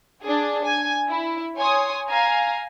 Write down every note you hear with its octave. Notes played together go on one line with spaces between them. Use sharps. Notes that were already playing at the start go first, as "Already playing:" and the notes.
D4 G#4
G#5
E4
C#5 G#5 C6 D#6
F5 G#5 A#5